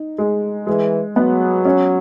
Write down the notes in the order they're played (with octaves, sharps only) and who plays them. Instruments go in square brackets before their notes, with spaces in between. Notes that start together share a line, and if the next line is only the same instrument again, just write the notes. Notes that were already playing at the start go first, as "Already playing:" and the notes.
Already playing: [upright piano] D#4
G#3
[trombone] E3 [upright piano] G#3
[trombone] F#3 [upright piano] B3
[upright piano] C#4